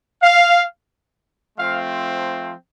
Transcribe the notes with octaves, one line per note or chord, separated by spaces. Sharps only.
F5
F3 A3 C4 F5